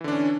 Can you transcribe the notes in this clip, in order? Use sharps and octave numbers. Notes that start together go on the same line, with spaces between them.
D3 E3 C#4 D4